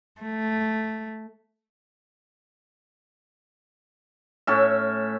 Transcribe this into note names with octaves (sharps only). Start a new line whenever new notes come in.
A3
A2 C#4 E5